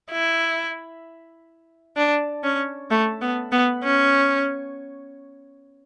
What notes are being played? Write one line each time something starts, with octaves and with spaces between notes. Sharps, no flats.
E4
D4
C#4
A3
B3
B3
C#4